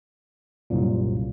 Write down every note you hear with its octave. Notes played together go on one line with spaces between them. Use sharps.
C2 F#2 A#2